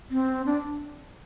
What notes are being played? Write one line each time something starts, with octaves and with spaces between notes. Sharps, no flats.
C4
D4